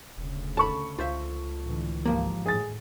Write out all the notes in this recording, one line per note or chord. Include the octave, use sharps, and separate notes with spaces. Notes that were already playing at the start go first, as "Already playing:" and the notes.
E1 D2 C#3
A4 A5 B5 C#6
C#2 F4 C5 E5
A2 D3 E3
G#1 D#2 F3 A#3
A2 G#4 A6